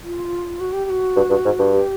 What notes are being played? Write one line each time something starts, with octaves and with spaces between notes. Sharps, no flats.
F4
F#4
G4
G4
F#4
G2
G2
G#2
G2
G4